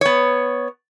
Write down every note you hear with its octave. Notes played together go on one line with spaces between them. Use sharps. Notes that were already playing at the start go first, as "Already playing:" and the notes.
B3 C#5